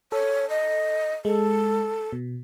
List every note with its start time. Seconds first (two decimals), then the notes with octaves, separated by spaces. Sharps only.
0.12 A4 C#5
0.50 D#5
1.25 G#3 A4
2.13 B2